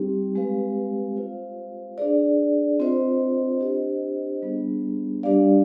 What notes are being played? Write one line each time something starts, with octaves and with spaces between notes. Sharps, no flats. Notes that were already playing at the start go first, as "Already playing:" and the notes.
Already playing: G3 C4 D#4 G4
G#3 C4 G4 B4 F5
F4 C5 F5
D4 G#4 D5
C4 F4 C5 D#5
D4 G4 C5 D#5
G3 B3 D4 G#4
G3 D4 G4 D5 F5